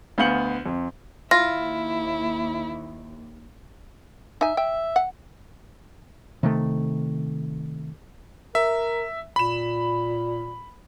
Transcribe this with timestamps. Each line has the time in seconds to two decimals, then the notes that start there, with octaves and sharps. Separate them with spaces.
0.18 D2 B3 F5 G6 C#7 F#7
0.66 F2
1.31 D#2 E4 F4 A#6
4.41 D#4 E5 G#5
4.57 E5 G5
4.96 F#5
6.43 C3 D#3 A3
8.55 A#4 E5
9.36 A#2 B5 E7